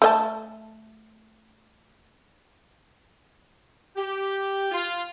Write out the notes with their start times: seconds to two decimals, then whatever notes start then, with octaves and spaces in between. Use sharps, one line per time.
0.02 A3 D#5 A5
3.96 G4
4.72 F4